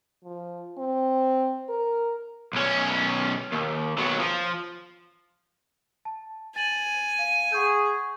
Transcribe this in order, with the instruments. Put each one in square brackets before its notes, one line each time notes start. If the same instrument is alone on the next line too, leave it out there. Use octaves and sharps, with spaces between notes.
[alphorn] F3
C4
A#4
[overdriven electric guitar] B1 C#4
D#2
B1 F#3
F3
[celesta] A5
[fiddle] G#5 [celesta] A6 F#7
[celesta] F5
[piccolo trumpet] G#4 [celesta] F#5 C#6 G6